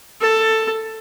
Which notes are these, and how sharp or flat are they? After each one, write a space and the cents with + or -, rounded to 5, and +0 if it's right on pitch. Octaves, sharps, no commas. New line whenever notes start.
A4 +10